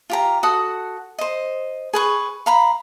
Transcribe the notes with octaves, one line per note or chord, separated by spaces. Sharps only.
F4 G4 A#5
F#4 A4 F#5 D#6
C5 D#5
G#4 B4 C#6
F5 A#5 B5